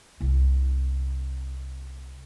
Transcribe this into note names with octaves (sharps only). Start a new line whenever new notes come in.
C2 E4